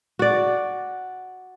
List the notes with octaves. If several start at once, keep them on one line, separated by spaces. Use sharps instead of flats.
F#4 D5